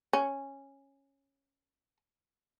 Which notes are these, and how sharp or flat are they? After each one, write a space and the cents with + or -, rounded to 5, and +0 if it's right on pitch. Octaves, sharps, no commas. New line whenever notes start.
C#4 -10